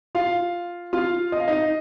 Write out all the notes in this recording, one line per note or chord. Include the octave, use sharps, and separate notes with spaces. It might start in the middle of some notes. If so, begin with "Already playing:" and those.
F4 F5
F4 F5
D#5
F5
D#4 D#5